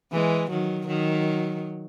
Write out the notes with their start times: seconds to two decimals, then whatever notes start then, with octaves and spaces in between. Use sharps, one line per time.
0.12 E3 G#3
0.50 D#3 F#3
0.87 D#3 F#3